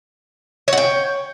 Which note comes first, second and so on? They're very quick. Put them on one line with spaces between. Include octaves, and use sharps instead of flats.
C#5 F#5 G5